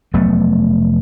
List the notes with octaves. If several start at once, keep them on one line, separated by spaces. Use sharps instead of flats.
F1 F#3 A3 B3